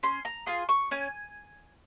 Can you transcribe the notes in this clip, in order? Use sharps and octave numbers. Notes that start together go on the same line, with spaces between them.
C#4 C6
A#5
F4 G#4 C6
C#6
C#4 G#5